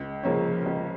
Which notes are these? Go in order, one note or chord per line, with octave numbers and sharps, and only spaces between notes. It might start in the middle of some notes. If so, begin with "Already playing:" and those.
Already playing: C#2
C#3 F3 A#3 C#4
C#2